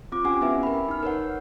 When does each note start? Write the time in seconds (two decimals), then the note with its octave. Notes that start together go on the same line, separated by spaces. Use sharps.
0.12 C4 F4 D6
0.24 C#4 G4 F#5 G#5
0.41 B3 C#4 E4 B4 E5 G#5
0.63 A#4 B5
0.89 D#4 F6
1.03 A#4 B4 C#5 F#5